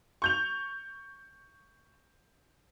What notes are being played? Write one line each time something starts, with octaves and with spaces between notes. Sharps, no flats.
C#6 G6 F7